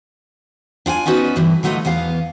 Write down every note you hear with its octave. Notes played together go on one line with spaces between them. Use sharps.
D4 F4 G5 G#5
B3 C#4 D#4 F#4 B4 D5
G2 D3 E3
D3 F#3 A3 F4 B4 D#5
E2 E3 B3 F5